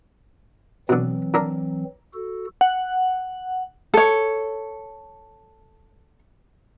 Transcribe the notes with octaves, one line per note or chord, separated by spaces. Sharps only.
B2 D3 E3 F#3 C4
D3 D4 A#4
F#4 A4
F#5
A4 C#5